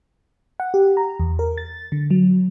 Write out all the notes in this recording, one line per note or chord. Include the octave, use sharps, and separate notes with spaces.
F#5
G4
A#5
E2
A#4
A6
D3
F#3